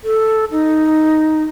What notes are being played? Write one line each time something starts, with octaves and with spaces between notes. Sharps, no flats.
A4
D#4